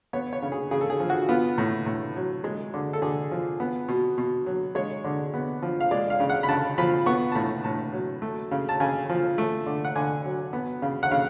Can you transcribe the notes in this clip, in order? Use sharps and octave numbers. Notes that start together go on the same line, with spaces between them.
B3 C#5
C#5
C#3
G#4
C#3 G#4
A4
G#4
F3
F#4
B3 F4
A2
A2
F#3
G#3
D3
A4
D3 G#4
F3
B3
B2
B2
F#3
G#3 C#5
D3
B3
F3
F5
G#3 D5
F5
C#3
F#5
B5
C#3 A5
F3 B5
B3 C#6
A5
A2 B5
A2 A5
F#3
A3
C#3
A5
C#3 G#5
F3
A3
D3
F#5
D3 G#5
F#3
B3
C#3
F#5
C#3 F5